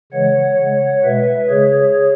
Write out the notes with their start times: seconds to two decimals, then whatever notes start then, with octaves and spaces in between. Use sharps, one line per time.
0.12 C#3 E3 G#3 C#5 F#5
0.58 C#3 G#3
1.03 B2 G#3 B4 E5
1.49 C#3 G#3 G#4 C#5